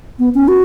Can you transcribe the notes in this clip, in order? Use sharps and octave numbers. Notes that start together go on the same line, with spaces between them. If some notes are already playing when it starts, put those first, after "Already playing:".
B3
C#4
F#4